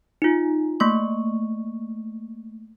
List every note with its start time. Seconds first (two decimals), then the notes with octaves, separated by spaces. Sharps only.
0.22 D#4 F4
0.80 A3 A#3 C#6